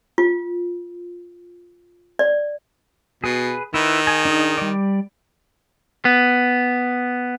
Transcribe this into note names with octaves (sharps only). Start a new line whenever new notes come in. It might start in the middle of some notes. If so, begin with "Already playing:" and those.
F4
D5
B2 G#4 B4
D#3 E4 B4
G#4 G#5
D4 D#4 G#4
G3 D5
B3